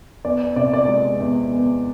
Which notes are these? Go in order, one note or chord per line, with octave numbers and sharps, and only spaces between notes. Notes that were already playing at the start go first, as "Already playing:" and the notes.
E2 D5
C3 D5
D5
G#3
E2
E2